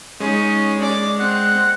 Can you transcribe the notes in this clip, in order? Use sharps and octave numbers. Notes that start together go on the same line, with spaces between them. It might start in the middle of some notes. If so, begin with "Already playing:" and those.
G#3 C#4 D#4
D5 D6
C4 F#5